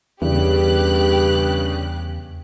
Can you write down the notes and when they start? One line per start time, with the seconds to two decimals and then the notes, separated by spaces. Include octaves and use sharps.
0.22 E2 G2 C#3 G4 F#6